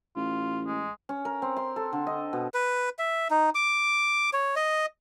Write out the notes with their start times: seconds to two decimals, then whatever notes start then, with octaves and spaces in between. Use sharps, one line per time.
0.17 A1 F4
0.66 G#3
1.09 C#4
1.25 A#4
1.42 C4
1.57 C6
1.76 A4
1.93 D3
2.07 D#5
2.33 B2
2.54 B4
2.99 E5
3.31 D#4
3.55 D6
4.33 C#5
4.56 D#5